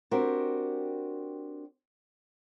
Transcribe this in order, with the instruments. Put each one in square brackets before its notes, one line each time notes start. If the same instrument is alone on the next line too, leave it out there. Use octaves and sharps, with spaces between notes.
[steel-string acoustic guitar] C4 D4 F#4 G4 A#4